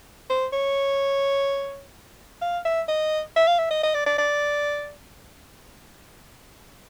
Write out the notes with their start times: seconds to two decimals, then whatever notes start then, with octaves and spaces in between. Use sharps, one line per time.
0.30 C5
0.53 C#5
2.42 F5
2.65 E5
2.88 D#5
3.36 E5
3.47 F5
3.59 E5
3.71 D#5
3.83 D#5
3.95 D5
4.06 D5
4.18 D5